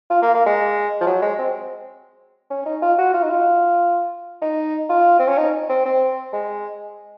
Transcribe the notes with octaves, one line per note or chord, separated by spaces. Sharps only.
F4
A#3
A#3
G#3
F3
F#3
G#3
C4
C#4
D#4
F4
F#4
F4
D#4
F4
D#4
F4
C4
C#4
D#4
C4
C4
G#3